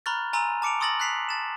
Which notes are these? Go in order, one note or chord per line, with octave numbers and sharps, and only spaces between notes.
A#5 B5 C#6 F6 F#6 A6
G#5 A#5 C6 E6 D#7 F7
A5 D6 C#7 D7 F7
C6 D#6 E6 A6 A#6 F#7
F#6 A6 B6 C7 F7
A5 A6 E7